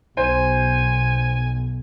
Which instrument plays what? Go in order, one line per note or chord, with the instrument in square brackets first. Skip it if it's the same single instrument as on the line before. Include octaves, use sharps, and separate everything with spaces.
[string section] B1 [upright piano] C5 [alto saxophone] G#5